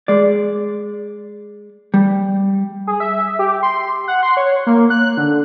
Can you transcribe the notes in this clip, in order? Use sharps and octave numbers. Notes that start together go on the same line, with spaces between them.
G#3 D5
G3
G#4
E5
G4
C6
F#5
C6
C#5
A#3
F#6
D3